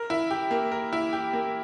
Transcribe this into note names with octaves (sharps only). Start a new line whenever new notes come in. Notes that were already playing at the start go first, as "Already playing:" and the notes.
Already playing: A#4
E4
G4
A#3
A#4
E4
G4
A#3